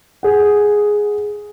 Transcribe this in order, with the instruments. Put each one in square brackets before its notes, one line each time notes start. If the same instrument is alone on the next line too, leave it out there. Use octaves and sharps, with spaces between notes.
[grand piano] G#4 F#5